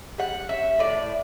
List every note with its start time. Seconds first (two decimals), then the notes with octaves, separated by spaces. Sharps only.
0.18 G3 F#5
0.49 C#4 E5
0.79 A2 D5